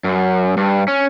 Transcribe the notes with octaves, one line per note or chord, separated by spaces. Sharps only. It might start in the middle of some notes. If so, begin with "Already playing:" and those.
F#2
G2
C#4